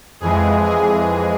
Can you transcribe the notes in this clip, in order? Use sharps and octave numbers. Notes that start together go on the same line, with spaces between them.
F2 E3 G#3 G#4
G#4